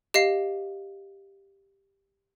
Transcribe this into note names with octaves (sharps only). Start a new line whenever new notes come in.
G4 D#5 F5 C7